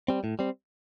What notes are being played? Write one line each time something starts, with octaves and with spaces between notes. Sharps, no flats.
G3 C4
A2
G3 C4